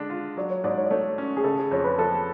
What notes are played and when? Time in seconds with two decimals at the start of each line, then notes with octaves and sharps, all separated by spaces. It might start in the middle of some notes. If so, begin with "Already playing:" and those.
Already playing: D3 G#3 D4
0.10 F4
0.37 F#3 D5
0.50 C#5
0.64 G#2 D5
0.77 C#5
0.84 D5
0.91 A3 C#5
1.18 C#4
1.37 G#4
1.44 C#3 A4
1.58 G#4
1.71 F2 C#5
1.84 B4
1.98 F3 A4